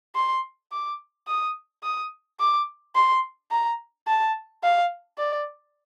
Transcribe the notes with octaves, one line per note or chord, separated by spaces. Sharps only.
C6
D6
D#6
D#6
D6
C6
A#5
A5
F5
D5